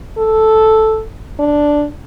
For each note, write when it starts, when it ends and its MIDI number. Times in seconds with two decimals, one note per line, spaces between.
0.18 1.03 69
1.39 1.86 62